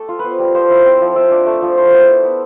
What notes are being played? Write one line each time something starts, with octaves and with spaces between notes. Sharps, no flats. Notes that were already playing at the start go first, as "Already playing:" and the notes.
Already playing: A3 G4 A4
F4
B3 B4 C5
G3
F3 C5
E4
C4
F3
F4 E5
D4
A3
F3
E4 C5
B3
E4
B3